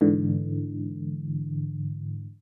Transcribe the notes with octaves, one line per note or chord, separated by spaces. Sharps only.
G#2 D3 E3